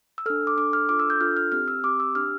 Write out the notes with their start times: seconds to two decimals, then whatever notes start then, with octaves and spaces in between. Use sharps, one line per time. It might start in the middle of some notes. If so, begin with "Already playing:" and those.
0.18 E6
0.26 A4 F6
0.30 D4
0.47 D6
0.57 D4 A4 D6
0.73 F6
0.89 D4 F4 A4 D6
0.99 E6
1.10 G6
1.21 D4 F4 A4 F6
1.37 F6
1.52 C4 G4 F6
1.68 E6
1.84 C4 G4 D6
2.00 E6
2.15 D4 G4 F6